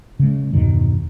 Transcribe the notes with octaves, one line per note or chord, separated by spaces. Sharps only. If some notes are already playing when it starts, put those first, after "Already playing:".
C#3 G#3
E2 G2 B2 D#3